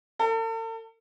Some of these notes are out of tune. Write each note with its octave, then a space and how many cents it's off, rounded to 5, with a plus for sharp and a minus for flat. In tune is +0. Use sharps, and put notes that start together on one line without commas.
A4 +45